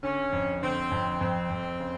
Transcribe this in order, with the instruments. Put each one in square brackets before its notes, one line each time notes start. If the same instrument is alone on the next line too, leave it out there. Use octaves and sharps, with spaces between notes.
[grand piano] D3 [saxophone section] C#4
[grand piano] F2
[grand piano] D3 [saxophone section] C4
[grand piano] F2
[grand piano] F2 [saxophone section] C4
[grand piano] F2
C#3